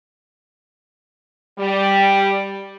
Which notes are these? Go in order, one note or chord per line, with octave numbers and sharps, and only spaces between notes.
G3